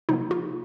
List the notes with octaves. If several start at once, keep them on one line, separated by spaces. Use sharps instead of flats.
C3 F3 A#3 D#4
F4